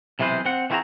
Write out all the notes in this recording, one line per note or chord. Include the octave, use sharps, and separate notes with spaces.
B1 C3 E3 G#3 B4 C5
C4 F#5
E3 A3 C4 F#4 G#4 A#5